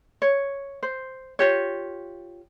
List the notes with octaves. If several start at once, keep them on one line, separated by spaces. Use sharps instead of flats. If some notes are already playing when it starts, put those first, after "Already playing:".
C#5
C5
F4 G4 C#5